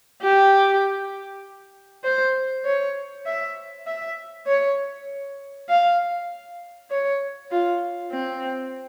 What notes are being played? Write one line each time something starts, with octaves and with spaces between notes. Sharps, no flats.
G4
C5
C#5
E5
E5
C#5
F5
C#5
F4
C4